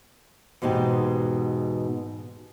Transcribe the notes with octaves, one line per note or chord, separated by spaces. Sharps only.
E2 G#2 B2 D#4 G4